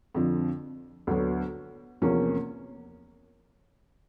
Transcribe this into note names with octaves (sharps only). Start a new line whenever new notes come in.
F2 D3 F3
D2 D3 F#3 B3
E2 C3 F3 A#3 C#4